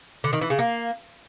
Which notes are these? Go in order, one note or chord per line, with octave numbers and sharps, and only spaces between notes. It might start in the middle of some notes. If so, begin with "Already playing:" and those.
D3
D#3
E3
C#3
A#3